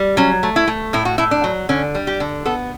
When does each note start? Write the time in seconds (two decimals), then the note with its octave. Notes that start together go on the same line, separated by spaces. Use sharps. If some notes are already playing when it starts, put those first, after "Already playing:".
Already playing: G3
0.17 F#3 C#4
0.43 A3
0.56 E4
0.67 A3
0.93 A2 E4
1.05 F#4
1.18 A2 E4
1.31 D4
1.44 F#3
1.69 D3 C#4
1.95 G3
2.07 G4
2.20 D3
2.45 B3 A4